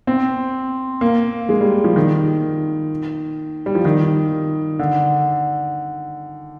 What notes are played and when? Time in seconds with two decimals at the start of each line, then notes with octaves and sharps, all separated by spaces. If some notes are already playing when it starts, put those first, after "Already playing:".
0.07 C4
1.01 A#3
1.49 G#3
1.61 G3
1.84 F3
1.96 D#3
3.66 G3
3.75 F3
3.85 D#3
4.79 D3